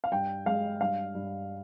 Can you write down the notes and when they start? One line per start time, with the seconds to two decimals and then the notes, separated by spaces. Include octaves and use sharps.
0.04 F5
0.12 G2 G5
0.46 G#3 F5
0.81 G2 F5
1.15 G2